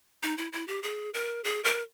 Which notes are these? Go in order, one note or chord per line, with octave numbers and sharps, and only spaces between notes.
D#4
E4
E4
G4
G#4
A#4
G#4
A#4